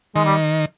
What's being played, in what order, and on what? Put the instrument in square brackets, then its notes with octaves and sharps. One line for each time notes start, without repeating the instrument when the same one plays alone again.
[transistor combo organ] D#3 [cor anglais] G#3
[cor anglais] G3